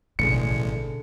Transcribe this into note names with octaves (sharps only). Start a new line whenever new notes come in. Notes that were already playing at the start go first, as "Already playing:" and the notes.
A1 B2 D3 G#4 C#7